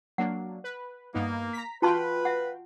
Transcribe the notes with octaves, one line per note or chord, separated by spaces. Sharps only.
F#3 A#3 D4 F#5
B4
G2 A#3 B3 D#4
A#5 B6
F4 F#4 B4 F5 G5 A5 C6
E5 F#5